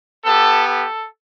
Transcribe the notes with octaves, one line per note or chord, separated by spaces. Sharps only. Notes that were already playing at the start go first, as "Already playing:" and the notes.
B3 G4 A4
A4